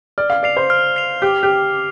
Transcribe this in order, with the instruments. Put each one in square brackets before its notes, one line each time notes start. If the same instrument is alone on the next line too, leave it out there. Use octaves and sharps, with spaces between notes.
[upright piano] D5 [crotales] F6
[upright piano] F5
[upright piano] D5 [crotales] C7 F7
[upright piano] C5
[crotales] F6
C7 F7
[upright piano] G4 [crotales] D6
[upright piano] G4